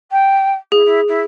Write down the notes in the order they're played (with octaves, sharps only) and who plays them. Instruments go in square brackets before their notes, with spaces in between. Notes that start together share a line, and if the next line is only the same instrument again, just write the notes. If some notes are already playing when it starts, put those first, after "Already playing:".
[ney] G5
[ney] E4 [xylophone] G#4
[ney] E4
E4